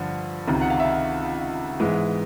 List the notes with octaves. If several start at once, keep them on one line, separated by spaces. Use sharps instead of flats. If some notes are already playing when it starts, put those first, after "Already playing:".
Already playing: G2 D3 F3
C#2 C3 D#3
F#5
F5
E5
G#2 E3 G#3 B3